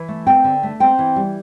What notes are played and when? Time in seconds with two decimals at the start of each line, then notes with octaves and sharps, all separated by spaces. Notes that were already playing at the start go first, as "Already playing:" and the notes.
Already playing: E3
0.08 A3
0.26 C4 G5
0.44 D3
0.63 A3
0.80 C4 G5
0.99 E3
1.16 G3